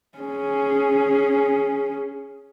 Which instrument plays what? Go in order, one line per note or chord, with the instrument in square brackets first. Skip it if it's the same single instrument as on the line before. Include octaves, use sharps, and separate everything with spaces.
[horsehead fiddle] C#4 G#4